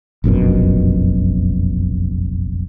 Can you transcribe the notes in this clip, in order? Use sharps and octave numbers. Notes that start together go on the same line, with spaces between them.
F1 A#1 F#2 B2